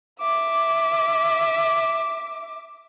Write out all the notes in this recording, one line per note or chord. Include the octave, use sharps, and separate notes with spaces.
E5 D6